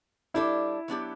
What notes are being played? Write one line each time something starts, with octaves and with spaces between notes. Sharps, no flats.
G3 D4 E4 A4
F#3 B3 D4 G4